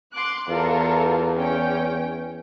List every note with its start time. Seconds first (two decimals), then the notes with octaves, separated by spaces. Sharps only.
0.13 C6 D6 F#6
0.49 E2 F4 A4 A#4
1.36 C#4 G5